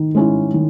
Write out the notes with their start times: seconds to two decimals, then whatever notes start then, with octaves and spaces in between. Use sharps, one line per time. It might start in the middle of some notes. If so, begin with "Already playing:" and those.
Already playing: D#3
0.15 G#3 C#4 E4
0.54 D#3